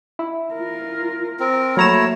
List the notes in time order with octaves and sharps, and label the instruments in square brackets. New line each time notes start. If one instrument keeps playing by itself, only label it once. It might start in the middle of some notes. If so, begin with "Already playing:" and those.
[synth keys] E4
[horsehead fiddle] F4 A#4
[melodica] C4 A#4
[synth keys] F#3 A#5 E7 [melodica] A3 E4 C#5 [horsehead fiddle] A#3